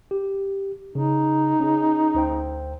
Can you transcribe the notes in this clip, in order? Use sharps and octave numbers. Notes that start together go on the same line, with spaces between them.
G4
C#3 D#4
C#4 G#4
D2 C5 G5